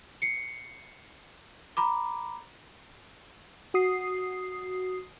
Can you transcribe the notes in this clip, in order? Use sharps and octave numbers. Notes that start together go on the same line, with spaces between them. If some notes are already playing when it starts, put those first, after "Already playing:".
C7 C#7
A#5 B5 D6
F#4 D#6 C7